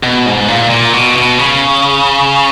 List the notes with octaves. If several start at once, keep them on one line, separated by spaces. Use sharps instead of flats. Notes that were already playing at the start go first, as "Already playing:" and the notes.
B2
G#2
A#2
A#2
B2
B2
C#3